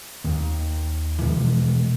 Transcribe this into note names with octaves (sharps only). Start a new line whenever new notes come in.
D#2
B2 E3 F3 G#3